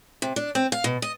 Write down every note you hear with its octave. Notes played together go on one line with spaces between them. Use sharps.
C3
D4
C4
F5
B2
D#5